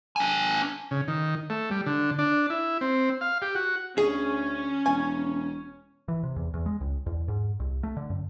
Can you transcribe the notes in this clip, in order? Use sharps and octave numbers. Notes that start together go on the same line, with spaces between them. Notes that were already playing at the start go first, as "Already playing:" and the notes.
D4 G#5
C#3
D#3
A3
G3
D3
D4
E4
C4
F5
G4
F#4
D2 C#4 G#4
E1 G#5
E3
C3
E2
E2
G#3
C#2
E2
G#2
C2
A3
D3
F#2